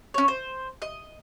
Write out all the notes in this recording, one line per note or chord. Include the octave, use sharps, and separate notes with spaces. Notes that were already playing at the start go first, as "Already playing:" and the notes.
C#4 C#5
C5
D#5